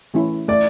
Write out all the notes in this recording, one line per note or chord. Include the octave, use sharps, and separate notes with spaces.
E3 A3 C#4 E4
A3 D5